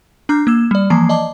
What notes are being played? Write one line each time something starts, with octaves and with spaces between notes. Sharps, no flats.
D4 A#5 D6 F6 G6
A#3 E6 E7
G3 D5
E3 F3 A#3 A#5 C7
D5 D#5 A5 D6